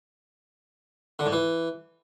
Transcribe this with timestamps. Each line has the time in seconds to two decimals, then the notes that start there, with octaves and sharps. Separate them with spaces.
1.19 D3
1.26 G#2
1.32 E3